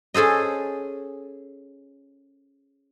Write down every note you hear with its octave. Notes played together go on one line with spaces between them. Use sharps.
C#4 G#4 A4 C5 D#5